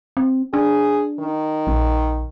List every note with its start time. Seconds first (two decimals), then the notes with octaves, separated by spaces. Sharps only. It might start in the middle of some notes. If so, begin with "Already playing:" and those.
0.17 C4
0.54 D4 G#4
1.20 D#3
1.67 A#1